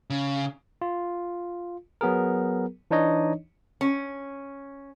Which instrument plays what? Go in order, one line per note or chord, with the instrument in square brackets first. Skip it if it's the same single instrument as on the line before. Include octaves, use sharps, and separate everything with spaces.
[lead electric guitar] C#3
[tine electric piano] F4
F#3 B3 G#4 A#4
E3 D4 D#4 C#5 D#5
[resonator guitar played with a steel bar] C#4